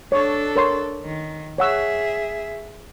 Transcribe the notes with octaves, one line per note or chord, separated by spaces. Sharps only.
D4 A4 C#5
A#4 C#5 C6
D#3
G#4 C#5 E5 F#5 E6